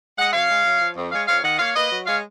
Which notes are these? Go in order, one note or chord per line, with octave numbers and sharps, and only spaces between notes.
G#3 D#5 F#5
F#2 C#5 F5
G#3
F#2
F3
F2
G#3 C#5 F5
F2 C#5 F5
D#3 D#5 F#5
A#3 C#5 F5
A#3 B4 D#5
F#3
G#3 C#5 F5